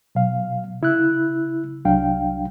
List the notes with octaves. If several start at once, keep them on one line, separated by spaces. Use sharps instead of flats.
B2 F#3 F5
C#3 E4 E6 F#6
C2 F#3 D4 F5 G5